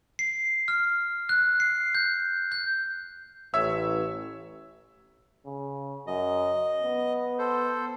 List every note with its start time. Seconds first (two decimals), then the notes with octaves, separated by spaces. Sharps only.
0.19 C7
0.68 F6
1.29 F#6
1.60 C7
1.95 G6
2.52 G6
3.54 A1 C#5 E5 E6
5.46 C#3
6.07 F#2 D#5
6.82 B3
7.38 A4 C5